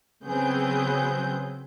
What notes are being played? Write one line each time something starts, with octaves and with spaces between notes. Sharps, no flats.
C#3 F#3 B3 C4 G#4 G6